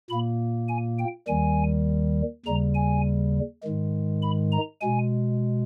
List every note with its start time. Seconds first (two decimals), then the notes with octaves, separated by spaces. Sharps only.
0.10 A#2 A#3 B5
0.69 G#5
0.99 G5
1.28 D#2 D#3 G3 G#5
2.46 D#2 C#3 G3 A#5
2.75 G#5
3.63 G#2 D#3 G#3
4.22 B5
4.52 A#5
4.81 B2 G#3 G#5